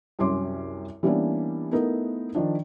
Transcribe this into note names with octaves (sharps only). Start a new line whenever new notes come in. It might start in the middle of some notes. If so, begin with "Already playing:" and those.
C2 F#2 C#4 C6 D6
E3 G3 A#3 B3 C#4 D4
A3 B3 D#4 E4 A#4
D#3 F3 D4